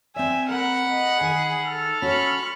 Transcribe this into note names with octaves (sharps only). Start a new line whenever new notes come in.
C4 D5 E5 G#5
A#4 F#5 B5
D#5
D#3 G#4
A4 F6
C#4 F#4 B5 C#6